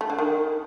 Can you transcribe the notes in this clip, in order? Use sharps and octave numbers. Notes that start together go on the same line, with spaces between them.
A3
D3
D#3